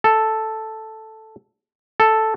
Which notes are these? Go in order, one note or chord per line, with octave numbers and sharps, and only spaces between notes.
A4
A4